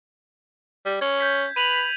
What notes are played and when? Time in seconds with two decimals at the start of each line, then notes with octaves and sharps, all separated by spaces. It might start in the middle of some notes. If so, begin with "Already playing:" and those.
0.85 G3
1.01 C#4 G#6
1.20 G6 B6
1.56 B4 D#7 F7 F#7